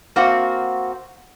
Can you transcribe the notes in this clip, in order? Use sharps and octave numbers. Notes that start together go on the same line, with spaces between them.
A#3 C4 F#4 F#5